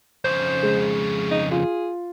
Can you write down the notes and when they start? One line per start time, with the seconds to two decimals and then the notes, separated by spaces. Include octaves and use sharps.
0.25 F2 C#3 C5
0.63 G#3
1.31 D#4
1.51 F4 G#4